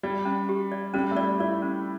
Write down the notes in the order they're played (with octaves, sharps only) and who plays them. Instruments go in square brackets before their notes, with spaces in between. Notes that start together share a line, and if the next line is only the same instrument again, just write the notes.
[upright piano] G3 [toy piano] D5
[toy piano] C#4
G4
D5
[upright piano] G3 [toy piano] C#4
[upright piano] A3
[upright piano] G3 [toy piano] D5
[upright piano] E4 [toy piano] D5
[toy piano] C#4